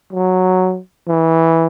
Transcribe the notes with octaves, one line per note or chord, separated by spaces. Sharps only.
F#3
E3